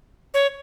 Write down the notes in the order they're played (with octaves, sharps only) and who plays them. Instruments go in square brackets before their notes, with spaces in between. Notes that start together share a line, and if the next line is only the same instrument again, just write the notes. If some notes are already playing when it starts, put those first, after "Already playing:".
[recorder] C#5